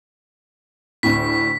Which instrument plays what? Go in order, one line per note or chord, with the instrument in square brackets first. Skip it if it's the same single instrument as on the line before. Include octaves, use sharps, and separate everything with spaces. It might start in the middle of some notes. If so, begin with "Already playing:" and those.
[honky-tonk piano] D2 A2 [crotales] B6